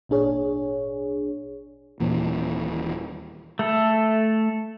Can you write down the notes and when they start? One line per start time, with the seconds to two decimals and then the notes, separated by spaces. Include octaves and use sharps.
0.09 G#1 A#2 D4 G#4 C#5
2.00 D#1 A#2 E3
3.59 A3 A4